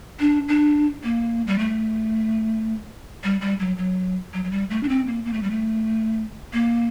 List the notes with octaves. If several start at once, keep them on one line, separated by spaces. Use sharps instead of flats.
D4
D4
A#3
G3
A3
G3
G3
F#3
F#3
F#3
F#3
G3
A3
D4
C4
A#3
A#3
A3
G3
A3
A#3